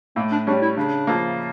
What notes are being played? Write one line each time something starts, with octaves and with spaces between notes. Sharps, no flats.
A2 A#3
D4
G3 C#4 D4
E4
C#3 D4
F3 A#3